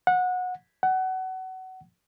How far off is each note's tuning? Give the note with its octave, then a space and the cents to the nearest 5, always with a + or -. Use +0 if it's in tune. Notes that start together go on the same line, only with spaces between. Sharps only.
F#5 -20
F#5 +25